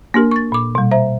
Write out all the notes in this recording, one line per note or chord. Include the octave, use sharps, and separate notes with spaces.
A#3 D4 G4 A#4
C#6 A6
A#2 D6
B2 G3
C5 E5 A#5